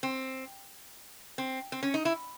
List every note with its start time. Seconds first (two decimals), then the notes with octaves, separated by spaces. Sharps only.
0.03 C4
1.38 C4
1.72 C4
1.83 C#4
1.94 D#4
2.05 E4